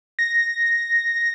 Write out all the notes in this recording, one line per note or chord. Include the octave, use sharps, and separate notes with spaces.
A#6